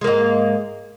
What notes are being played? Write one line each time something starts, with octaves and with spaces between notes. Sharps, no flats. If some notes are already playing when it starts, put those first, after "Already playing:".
G#2 G#3 A#3